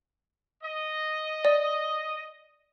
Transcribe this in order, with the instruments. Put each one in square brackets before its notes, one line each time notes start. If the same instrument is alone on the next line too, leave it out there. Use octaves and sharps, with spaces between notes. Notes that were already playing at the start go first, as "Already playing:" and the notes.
[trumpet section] D#5
[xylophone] D5